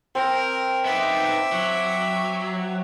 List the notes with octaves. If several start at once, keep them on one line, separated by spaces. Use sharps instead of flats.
C4 A#4
B3 D#4 E5 D6
F#3